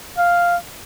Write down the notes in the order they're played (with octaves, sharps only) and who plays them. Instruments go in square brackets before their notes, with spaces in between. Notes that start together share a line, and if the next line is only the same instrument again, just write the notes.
[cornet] F5